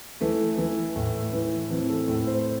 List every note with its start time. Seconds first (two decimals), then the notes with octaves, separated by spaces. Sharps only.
0.21 E3 A3
0.58 E3
0.96 A2
1.33 E3
1.70 E3 C4
1.89 A4
2.08 A2
2.27 C5